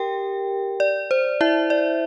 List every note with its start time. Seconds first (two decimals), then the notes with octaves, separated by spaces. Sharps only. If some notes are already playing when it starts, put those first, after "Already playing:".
Already playing: G4 A#4 G5
0.80 D5
1.11 C5
1.41 E4 E5
1.70 D5